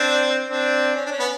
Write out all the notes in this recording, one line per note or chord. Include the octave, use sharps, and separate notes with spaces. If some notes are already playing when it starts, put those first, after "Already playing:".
Already playing: C4 D4
C4 D4
C#4
D4
C#4
B3